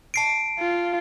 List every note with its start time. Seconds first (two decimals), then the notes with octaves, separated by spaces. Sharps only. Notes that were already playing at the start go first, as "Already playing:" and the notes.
0.14 A5 C7 D7
0.59 F4